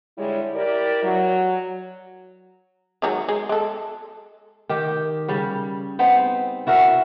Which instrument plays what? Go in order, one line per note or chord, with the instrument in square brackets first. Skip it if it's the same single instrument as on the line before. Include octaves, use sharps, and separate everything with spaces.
[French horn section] D3 G3 G#3 E4 C#5
E4 G4 A#4 D5
F#3
[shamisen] D#3 F#3 G#3
G#3
G#3 A4
[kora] D#3 G4
C#3 G3
B3 C4 D#4
E4 F#4 A#4 E5